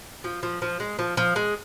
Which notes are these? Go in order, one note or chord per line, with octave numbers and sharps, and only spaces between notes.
F3
F3
F3
G#3
F3
F3
G#3